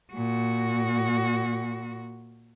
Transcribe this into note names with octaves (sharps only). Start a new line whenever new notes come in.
A#2 F#4